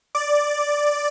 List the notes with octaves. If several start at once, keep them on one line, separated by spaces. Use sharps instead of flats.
D5